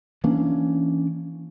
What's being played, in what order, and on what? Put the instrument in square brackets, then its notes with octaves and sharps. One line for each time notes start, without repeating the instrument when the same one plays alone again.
[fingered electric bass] E3 A#3 C#4 D4